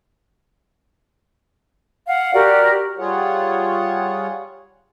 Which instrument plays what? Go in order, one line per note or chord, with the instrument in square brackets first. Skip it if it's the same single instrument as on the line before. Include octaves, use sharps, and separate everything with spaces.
[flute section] F5 F#5
F#4 G4 A#4 D5
[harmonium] G3 F4 G#4 C#5 F#5